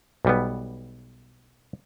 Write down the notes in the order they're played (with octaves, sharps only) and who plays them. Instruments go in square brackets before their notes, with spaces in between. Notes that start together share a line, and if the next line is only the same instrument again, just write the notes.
[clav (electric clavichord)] B1 G3 B3